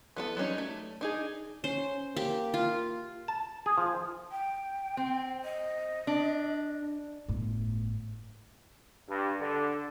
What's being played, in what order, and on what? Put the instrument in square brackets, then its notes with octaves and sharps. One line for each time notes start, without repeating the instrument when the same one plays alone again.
[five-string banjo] E3 B3 A4
F#3 G3 C#4 D#4
A3
D4 D#4 G#4
[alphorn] C#4 [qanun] C5
[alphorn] A#3 [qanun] G4
[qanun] F4
[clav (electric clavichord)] A5
G#4
F3
[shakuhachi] G5
[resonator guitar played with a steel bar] C4
[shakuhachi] D#5
[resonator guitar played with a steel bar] D4
[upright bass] G1 A2
[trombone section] G2
D3